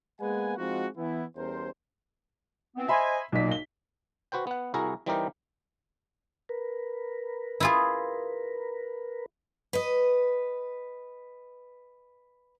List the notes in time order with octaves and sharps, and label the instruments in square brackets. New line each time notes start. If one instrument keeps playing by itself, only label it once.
[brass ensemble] G#3 A#3 B3 B4 F#5 G#5
F3 G#3 C4 D#4 F4 F#4
E3 B3 E4
E2 G3 C#4 A#4 C5
[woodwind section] E3 B3 C4
[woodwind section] C5 D#5 G#5 [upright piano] E5 B5 C6
[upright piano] B1 B6 [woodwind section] A#2 A#3
[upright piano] G7
[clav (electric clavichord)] F#4 B4 C5 G5
B3 F#5
C2 E4 F#4 G#4 A#4 A#5
E3 G3 C4 D#4 G4 A#4
[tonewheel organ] A#4 B4
[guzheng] E4 F4 G#4
[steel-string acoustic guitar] B4 D#5